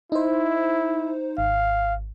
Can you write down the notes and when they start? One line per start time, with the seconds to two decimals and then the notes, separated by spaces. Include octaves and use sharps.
0.12 D#4 E4 C5
1.38 G#1 F5